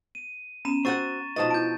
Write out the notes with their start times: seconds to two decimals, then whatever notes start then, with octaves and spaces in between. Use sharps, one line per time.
0.15 D#7
0.65 B3 C#4 A#5 D#7 E7
0.85 C4 F#4 F#5 C#6 A6 D#7
1.36 B2 F3 D#4 B4 D#5 A5 A6
1.50 E4 A5 G6 D7